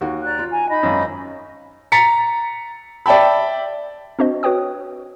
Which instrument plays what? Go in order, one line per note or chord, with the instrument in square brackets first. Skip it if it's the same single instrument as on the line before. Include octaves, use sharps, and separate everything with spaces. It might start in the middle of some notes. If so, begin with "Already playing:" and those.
[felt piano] D#2 F#4
[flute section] D5 A#5 F#6
[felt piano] F4
[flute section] G#5 A#5
D#4 D#5 B5
[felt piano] G#1 F#2
[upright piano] A#5 A6 B6 C#7
D5 E5 G5 A5 B5
[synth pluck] C4 D4 F#4 C5 D#5
F#4 B4 C#5 G5 D#6